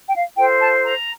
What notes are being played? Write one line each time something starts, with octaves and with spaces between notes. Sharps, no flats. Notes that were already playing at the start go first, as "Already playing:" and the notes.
G5
F5
F4 A4 C5 G5
A5
A#5